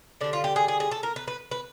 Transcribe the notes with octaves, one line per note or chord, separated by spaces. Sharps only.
D3 G3 D4
F4
G4
G#4
G#4
G#4
A4
A#4
B4
B4
B4